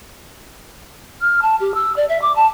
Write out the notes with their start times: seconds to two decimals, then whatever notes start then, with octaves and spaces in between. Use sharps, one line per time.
1.21 F6
1.42 A5
1.60 G4
1.74 E6
1.96 D5
2.08 E5
2.21 D6
2.35 A5